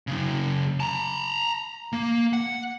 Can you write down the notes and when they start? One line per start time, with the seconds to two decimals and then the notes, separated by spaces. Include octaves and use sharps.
0.07 F#2 C#3
0.80 A5 A#5
1.93 A#3
2.33 F#5